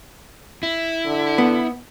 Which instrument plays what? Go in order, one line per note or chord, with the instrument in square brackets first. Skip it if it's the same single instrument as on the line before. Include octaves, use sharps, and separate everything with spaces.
[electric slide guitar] E4
[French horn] D3
[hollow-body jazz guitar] B3